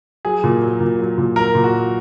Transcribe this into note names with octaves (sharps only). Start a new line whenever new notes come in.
F#3 G#4
A#2
F#3
A#2
F#3
A#2
F#3 A#4
A#2
F#4
F#3